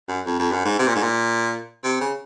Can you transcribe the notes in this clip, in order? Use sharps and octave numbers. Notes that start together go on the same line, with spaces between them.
F#2
F2
F2
F#2
G#2
C3
A#2
G#2
A#2
C3
C#3